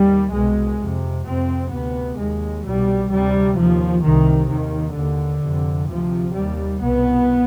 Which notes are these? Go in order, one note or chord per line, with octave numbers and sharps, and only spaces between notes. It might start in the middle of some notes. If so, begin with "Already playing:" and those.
Already playing: D#2 G3
C2 B2 G#3
F2 C3
F2 C3 C4
D2 C3 B3
D#2 G#3
C2 B2 G3
D2 C3 G3
D#2 F3
C2 C3 D#3
D#2 D#3
D#2 D3
F2 C3
D2 C3 F3
D#2 G3
C2 B2 B3